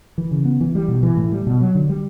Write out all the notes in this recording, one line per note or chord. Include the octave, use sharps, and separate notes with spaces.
E3
C#3
B3
E3
G3
B2
E3
A2
G3
B2
F#3
D3
G3